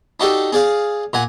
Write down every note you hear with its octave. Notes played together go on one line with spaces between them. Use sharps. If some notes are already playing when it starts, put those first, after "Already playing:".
D4 D#4 F#4 G4 A4
G#4 D5 F5
A#2 F#5 G#5